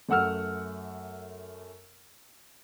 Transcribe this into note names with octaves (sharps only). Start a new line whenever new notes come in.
F#2 A3 F#5 E6 F6